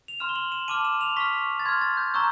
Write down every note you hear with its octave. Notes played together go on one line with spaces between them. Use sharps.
F7
C6 F6 E7
G7
F#7
E7
A5 D6 F6 D#7
E7
F7
C#6 F6 B6
A6
C6 F6 G#6
A6
G6
A#5 C#6 E6 G6